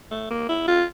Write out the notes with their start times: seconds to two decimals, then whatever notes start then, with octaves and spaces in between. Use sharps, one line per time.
0.11 A3
0.30 A#3
0.49 E4
0.68 F4